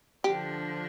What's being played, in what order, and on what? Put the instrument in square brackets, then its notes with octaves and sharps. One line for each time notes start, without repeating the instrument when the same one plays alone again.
[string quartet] D3 F3 D4 [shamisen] G4